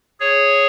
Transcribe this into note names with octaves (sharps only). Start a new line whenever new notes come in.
G#4 C#5